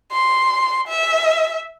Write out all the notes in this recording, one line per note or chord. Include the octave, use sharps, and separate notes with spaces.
C6
E5